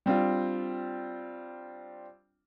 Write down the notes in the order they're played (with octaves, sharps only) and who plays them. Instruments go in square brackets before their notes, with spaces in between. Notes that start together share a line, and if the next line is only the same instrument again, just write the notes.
[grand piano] G3 C4 D4 F4